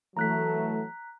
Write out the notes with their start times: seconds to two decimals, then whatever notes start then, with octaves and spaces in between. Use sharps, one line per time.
0.17 E3 F#3 A3 A#5 F#6 B6